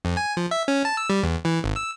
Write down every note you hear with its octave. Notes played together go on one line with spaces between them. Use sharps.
F2
G#5
F3
E5
C#4
A5
E6
G3
E2
E3
G#1
E6